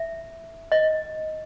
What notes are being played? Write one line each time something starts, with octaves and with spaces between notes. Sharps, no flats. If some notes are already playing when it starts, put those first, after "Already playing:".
Already playing: E5
D#5